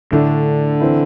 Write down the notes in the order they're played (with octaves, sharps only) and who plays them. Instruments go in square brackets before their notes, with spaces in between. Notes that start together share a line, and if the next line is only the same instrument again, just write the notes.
[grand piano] A2 A3 D4 [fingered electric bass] D3
[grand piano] E3 C4 E4